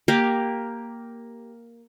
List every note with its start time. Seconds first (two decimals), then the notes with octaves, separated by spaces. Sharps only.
0.08 A#3 G4 F5